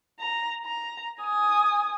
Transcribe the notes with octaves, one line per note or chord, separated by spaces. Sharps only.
A#5
A#5
G#5 D#6